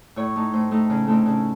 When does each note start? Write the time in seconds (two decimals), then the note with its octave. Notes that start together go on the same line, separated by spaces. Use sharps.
0.16 A2 C#5
0.36 A3 D#4
0.53 A2 C5
0.71 A3 D#4
0.90 C#3
1.08 A3 C4 D#4
1.26 C#3